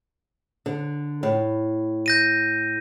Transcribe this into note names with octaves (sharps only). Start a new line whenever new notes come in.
D3
A2
G6 A#6 D#7